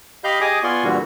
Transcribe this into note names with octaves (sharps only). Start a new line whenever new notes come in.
G4 D#5 F5 B5 F6 G6
G4 G#4 D#5 G#5 D6 D#6
B3 F4 D5 G#5 C6 C#6
A#2 D3 E3 G3 F#4